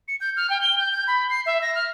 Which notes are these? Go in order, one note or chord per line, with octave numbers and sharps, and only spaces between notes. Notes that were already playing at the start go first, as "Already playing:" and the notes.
C#7
G6
F6
G5
G7
G6
G6
B5
C7
E5
A#6
F6